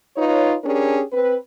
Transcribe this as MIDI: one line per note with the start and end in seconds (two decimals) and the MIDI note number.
0.17 0.55 63
0.17 0.55 65
0.17 0.55 71
0.17 0.55 73
0.64 1.01 61
0.64 1.01 62
0.64 1.01 67
0.64 1.01 68
0.64 1.01 70
1.13 1.35 60
1.13 1.35 71